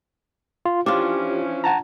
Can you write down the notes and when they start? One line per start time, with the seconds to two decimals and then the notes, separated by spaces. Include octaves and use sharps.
0.66 F4
0.86 E3 F3 C#4 D4 F4 G4
1.64 F#5 A5 A#5